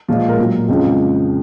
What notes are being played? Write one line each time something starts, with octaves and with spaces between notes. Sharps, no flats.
A#2 F3 G#3 F4
A#4
A#2 F#3
F2 C#3 F3 G#3